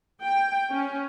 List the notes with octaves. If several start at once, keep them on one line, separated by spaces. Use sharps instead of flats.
G5
C#4